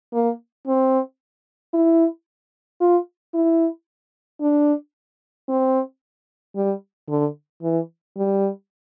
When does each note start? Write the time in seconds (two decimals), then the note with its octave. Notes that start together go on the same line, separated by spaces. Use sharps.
0.13 A#3
0.67 C4
1.74 E4
2.81 F4
3.34 E4
4.41 D4
5.48 C4
6.55 G3
7.09 D3
7.63 E3
8.17 G3